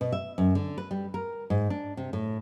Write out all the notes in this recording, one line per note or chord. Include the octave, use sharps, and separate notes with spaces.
B2
E5
F#2
D3
B4
G3
A#4
G#2
D4
C3
A2